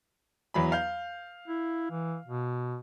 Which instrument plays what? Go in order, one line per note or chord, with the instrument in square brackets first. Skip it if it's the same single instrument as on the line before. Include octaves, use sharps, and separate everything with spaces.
[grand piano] E2 F#3 B5
F5 G6
[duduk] E4
E3
B2